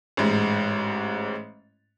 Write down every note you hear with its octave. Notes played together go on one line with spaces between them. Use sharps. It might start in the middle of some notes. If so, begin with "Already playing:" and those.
A1 G#2